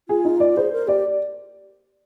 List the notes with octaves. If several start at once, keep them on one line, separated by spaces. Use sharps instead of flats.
F4 G#4
D#4
D5
G#4 C5
A#4
G4 D5